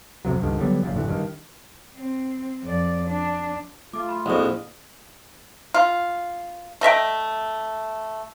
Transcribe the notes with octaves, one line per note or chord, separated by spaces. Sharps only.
B1 F2 C3 F#3
C#2 G2 D3 D#3
D3 F#3 G3 B3
F#1 F#2 A#2
A1 F#2 D3 E3
G2 D#3
C4
F2 D5
D4
A3 F4 D6
B5 C6
A#1 F2 G#3 E4 F#4 C5 B5 D#6
F4
A3 D#5 E5 G5